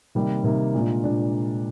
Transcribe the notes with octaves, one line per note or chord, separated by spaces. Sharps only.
C3 D#3 G3 A#3
C3 D#3 G3 A#3
A#2 G#3 D4 F4
A#2 G#3 D4 F4